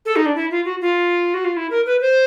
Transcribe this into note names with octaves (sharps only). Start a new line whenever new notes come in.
A4
D#4
D4
E4
F4
F#4
F4
F#4
F4
E4
A#4
B4
C5